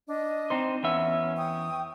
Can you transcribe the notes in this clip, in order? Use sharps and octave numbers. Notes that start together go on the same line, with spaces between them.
D4 D#5
C4 D#4 C5
E2 B3 C#4 E5
G5 C#6 D#6